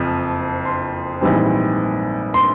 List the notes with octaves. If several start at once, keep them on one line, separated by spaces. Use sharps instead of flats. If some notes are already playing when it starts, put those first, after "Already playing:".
Already playing: F#1 F2 F3
C6
A#1 G#2 E3 G3 C4
C6